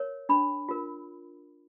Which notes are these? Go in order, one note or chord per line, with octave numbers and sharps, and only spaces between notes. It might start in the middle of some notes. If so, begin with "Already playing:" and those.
Already playing: A#4 C#5
D4 B5
F4 A#4